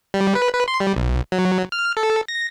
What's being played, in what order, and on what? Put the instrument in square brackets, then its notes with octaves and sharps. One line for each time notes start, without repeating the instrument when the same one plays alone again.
[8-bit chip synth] G3
B4
B4
C6
G3
B1
F#3
F6
A4
A#6